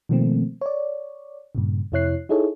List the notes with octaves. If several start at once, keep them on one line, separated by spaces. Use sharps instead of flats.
B2 D#3 F3 A3 A#3 C4
C#5 D5
G2 A#2 C#3
F2 C3 E4 C#5 F#6 C7
D#4 E4 G#4 A4 C#5